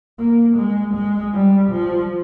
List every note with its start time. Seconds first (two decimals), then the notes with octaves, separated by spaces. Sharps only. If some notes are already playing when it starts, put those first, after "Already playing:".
0.19 A#3
0.57 G#3
0.95 G#3
1.34 G3
1.71 F3